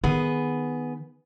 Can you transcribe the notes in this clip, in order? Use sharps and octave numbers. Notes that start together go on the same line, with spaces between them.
D#3 B3 G#4